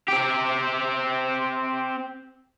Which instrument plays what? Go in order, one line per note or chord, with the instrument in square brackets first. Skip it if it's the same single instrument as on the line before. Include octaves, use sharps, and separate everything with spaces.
[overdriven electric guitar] C4 G4